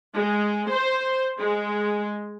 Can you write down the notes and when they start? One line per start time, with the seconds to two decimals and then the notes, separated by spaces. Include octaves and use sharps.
0.15 G#3
0.70 C5
1.38 G#3